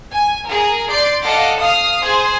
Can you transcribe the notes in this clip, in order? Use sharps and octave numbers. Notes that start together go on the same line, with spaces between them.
G#5
G#4 A#4
D5 C6 G6 C7 D7
A4 D#5 F5 F#5 D6
F5 D#6 F6 C7
G#4 C5 G#5 C6